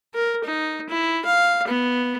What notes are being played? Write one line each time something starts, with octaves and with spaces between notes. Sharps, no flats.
A#4
D#4
E4
F5
B3